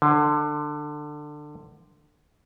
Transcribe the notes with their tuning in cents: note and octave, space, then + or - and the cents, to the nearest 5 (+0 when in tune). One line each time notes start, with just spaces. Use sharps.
D3 +20